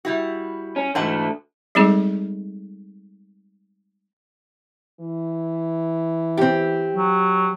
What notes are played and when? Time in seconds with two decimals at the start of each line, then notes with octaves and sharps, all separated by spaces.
0.05 G3 E4 F#4
0.76 C#4
0.95 G#2 D3 E3 A3 F#5
1.75 G3 G#3 C4 D#4 G#4 A4
5.00 E3
6.37 C4 G4
6.96 F#3